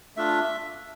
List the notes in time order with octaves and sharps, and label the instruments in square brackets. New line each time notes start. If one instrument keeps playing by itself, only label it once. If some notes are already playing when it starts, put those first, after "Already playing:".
[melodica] A3 D4 F4 E5